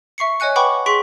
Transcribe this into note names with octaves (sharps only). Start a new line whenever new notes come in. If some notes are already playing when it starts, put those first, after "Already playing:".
E5 C#6 C7 C#7
C#5 D#5 G#5 F#6 C#7
B4 F#5 G5 B5 C#6 D6
G#4 C6 C#6 B6 D7 G7